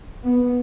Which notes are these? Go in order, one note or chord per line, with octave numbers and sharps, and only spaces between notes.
B3